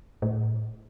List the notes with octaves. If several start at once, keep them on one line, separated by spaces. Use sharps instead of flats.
A2